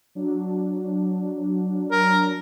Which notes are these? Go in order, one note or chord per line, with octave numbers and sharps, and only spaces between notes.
F#3 D4
A#4